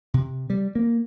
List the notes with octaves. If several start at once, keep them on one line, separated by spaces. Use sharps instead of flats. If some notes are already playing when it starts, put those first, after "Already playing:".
C3
G3
A#3